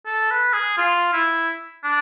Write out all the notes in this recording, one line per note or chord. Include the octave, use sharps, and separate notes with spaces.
A4
B4
G#4
F4
E4
D4